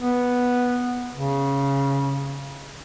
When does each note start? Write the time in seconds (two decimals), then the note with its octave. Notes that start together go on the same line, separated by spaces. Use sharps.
0.01 B3
1.15 C#3